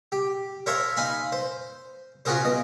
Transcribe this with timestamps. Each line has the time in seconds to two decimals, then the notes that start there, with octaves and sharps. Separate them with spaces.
0.12 G4
0.66 A#4 C5 C#5 E5 F5 A5
0.97 D#4 F5 G#5 B5 C6
1.32 C5
2.25 C#4 F4 F#4 G#4 A#4 C5
2.44 B2 D#5